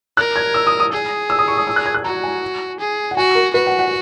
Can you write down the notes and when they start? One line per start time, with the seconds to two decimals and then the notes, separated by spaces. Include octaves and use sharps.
0.17 A#4 F#6
0.36 G#6
0.54 E6
0.67 D#6
0.80 D#6
0.92 G#4
1.30 E6
1.39 D#6
1.48 C#6
1.57 D#6
1.67 E6
1.76 F#6
1.86 G#6
1.94 F#6
2.04 F#4 A#5
2.23 G#5
2.80 G#4
3.11 F#5
3.17 F#4 G#5
3.35 A#4
3.54 F#4 B4
3.67 F#5
3.79 F#5